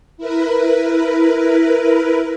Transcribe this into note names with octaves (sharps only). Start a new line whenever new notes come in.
E4 A#4 B4